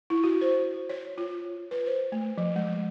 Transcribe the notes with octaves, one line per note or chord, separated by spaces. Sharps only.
E4
F#4
C5
C#5
F4
B4
C5
A3
F3
G#3